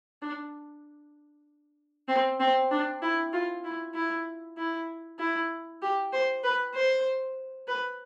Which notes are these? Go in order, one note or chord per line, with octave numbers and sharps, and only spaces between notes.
D4
C4
C4
D4
E4
F4
E4
E4
E4
E4
G4
C5
B4
C5
B4